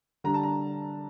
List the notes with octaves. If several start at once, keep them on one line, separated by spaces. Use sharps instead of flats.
D3 G3 D4 A#5
A5
A#5